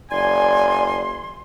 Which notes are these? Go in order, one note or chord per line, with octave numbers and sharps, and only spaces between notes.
F#1 D5 G#5 C6